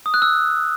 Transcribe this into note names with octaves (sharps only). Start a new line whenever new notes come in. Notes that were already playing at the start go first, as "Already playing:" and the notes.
D#6
F#6
E6